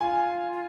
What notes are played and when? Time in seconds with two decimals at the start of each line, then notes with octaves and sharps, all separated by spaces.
0.01 F4 G#5
0.52 F4